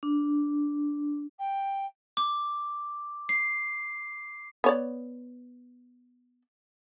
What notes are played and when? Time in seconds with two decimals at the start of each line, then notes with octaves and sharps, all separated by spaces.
0.03 D4
1.39 G5
2.17 D6
3.29 C7
4.64 B3 C#5 D5